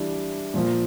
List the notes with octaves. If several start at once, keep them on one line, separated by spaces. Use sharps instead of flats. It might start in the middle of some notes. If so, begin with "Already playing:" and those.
Already playing: E3 G3 D4
A#2 F3 A#3